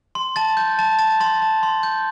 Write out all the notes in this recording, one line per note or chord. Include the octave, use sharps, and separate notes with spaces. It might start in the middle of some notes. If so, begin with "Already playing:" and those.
C6
A5 A6
G6
A5 A6
A5 A6
C6 A6
A5
C6
G6